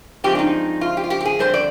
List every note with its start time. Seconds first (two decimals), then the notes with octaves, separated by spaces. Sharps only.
0.24 G2 F3 G#3 C4 G4
0.35 D4
0.39 D#4
0.81 F4
0.97 G4
1.04 F4
1.10 G4
1.20 G4
1.25 G#4
1.39 F2 D3 G3 D4 C5
1.54 D5